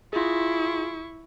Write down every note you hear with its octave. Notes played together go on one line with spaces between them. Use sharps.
E4 F4 G#4 C#6